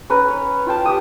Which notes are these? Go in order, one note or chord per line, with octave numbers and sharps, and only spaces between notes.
C#4 B4 A#5
C#5
F4 G5 A5
G4 D#6